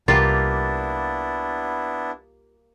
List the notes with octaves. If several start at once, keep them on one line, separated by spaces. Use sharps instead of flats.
C2 A#3 B3 D4 E4 F4 G4 A6